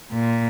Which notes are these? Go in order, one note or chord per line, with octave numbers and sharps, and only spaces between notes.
A#2